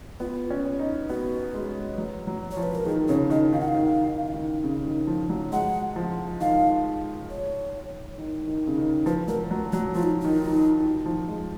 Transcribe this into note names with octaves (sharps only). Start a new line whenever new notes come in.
B3 F4
C#4
D#4
B3 F#4
G#3
F#3
F#3
C#5
F3
B4
A#4
D#3 G#4
C#3 C#5
D#3 D#5
D#3 F5
F#5
F5
D#3
D#3
D#3
C#3
D#3
F3
F#3
G#3 F#5
F3
D#3 F5
C#5
D#3
D#3
C#3
D#3
F3 B4
F#3 A#4
F#3
F#3 F#4
F3 F4
D#4
D#3 D#4
D#3
D#3
F3
G#3